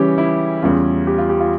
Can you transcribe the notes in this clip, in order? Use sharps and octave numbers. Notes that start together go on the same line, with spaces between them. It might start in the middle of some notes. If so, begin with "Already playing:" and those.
Already playing: C#3 E3 G3 C#4 G4
E4
E2 C#3 G3 C#4 F4
G4
F4
G4
F4